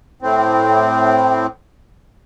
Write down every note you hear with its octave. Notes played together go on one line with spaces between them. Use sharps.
A2 C4